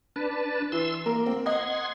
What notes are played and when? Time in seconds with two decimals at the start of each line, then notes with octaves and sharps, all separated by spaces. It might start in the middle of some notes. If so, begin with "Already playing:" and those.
0.16 D4 B4 A5
0.72 E3 C6 E6
1.06 A#3 A#4
1.26 C4
1.46 D#5 F#5 C6 G#6